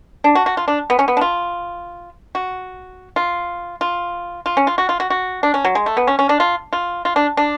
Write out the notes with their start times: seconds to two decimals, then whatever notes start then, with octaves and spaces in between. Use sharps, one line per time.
0.24 D4
0.35 F#4
0.46 F#4
0.57 F4
0.68 D4
0.90 B3
0.99 C#4
1.08 B3
1.17 D4
1.21 F4
2.35 F#4
3.16 F4
3.81 F4
4.46 F4
4.57 C#4
4.67 F4
4.78 F#4
4.89 F4
5.00 F#4
5.10 F#4
5.43 D4
5.54 C#4
5.65 F#3
5.75 G#3
5.86 A3
5.97 B3
6.07 C#4
6.19 C#4
6.29 D4
6.40 F4
6.73 F4
7.05 F4
7.16 D4
7.37 D4